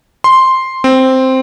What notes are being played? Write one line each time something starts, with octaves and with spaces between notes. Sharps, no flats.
C6
C4